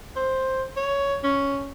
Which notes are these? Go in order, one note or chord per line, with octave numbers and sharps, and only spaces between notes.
C5
C#5
C#4